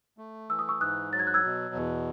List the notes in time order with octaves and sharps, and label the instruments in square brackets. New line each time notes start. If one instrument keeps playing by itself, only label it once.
[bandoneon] A3
[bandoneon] E3 [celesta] E6
[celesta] D#6
C#6 E6
[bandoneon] G#2 [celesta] D#6 F#6
[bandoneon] F#3 [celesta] A6
[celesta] G#6
F#6
E6 G#6
[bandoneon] B2
E2